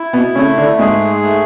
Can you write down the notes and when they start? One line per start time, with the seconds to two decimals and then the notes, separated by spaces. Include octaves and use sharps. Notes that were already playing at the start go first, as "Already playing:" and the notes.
Already playing: E4
0.13 B2 B3
0.35 C#3 A3 C#4
0.57 D3 D4
0.79 G#2 G#3 G#4
1.23 A3